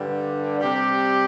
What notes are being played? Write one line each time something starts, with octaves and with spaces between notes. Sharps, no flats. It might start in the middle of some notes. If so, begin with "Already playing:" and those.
Already playing: G2 D3 G3
C3 G3 G4